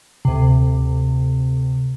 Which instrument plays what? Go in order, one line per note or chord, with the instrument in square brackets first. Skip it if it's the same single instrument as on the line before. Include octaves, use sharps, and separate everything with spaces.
[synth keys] D2 C3